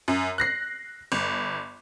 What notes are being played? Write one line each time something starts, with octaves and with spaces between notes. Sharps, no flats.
F#2
F#6 A#6 C7
G1